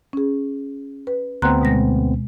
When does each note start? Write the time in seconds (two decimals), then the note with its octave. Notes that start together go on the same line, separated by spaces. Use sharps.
0.13 C#4 G#4
1.07 B4
1.42 D2 B3 C4 A#5 C6 F#6
1.62 B2 G#3 A#6